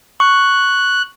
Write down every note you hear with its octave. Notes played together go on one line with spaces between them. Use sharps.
C#6 F#6